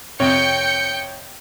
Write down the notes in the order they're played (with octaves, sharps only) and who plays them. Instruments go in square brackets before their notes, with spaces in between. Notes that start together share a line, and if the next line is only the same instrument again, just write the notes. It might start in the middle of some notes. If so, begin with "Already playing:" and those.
[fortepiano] F2 C3 [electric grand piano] C#5 [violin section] G5 G6 C#7